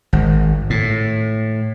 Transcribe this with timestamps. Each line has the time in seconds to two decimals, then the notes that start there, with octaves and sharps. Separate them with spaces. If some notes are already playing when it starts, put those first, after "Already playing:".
0.13 G#1
0.70 A2